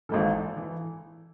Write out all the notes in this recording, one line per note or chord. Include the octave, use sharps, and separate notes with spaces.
G#1 G#2 E3 A4
E3